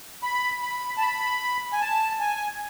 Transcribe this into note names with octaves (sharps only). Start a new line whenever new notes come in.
B5
B5
A5
B5
G#5
A5
G#5